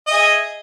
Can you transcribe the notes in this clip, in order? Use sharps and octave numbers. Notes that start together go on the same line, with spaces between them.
G#4 D#5 E5